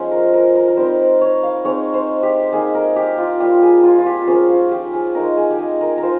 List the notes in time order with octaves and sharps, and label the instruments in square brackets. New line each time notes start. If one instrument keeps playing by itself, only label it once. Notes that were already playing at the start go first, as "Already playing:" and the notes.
Already playing: [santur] F3 G#3 C#4 D#4 C5
A#4
A#4
A#4
A#4
G3 C4 D#4 C5
C#5
F5
G#3 C4 D#4 C#5
C5
G4
A#3 D#4 G#4
A#4
G4
F4
G3 A#3 F4 G4
G#4
F4
F4
G4
F3 A#3 C#4 G#4
F4
G4
G#4
G#3 D#4 A#4
G#4
G4
G#4
A#4
A#4
F4 C5